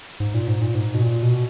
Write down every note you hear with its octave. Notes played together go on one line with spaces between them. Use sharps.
G#2
A#2
G#2
A#2
G#2
B2
A#2
B2